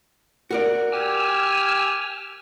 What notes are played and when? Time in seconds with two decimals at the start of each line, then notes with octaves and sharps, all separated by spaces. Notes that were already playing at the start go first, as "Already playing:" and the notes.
0.51 F#4 A#4 D5
0.92 G4 G#5 E6 F6